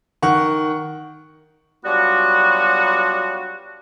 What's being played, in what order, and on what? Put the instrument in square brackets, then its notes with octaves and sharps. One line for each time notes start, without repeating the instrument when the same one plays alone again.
[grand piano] D#3 F#5 C#6
[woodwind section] F#3 G3 B3 D4 F4 F#4